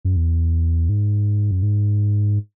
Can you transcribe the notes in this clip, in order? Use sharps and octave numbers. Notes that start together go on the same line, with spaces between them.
F#2
E2
G#2
F#2
G#2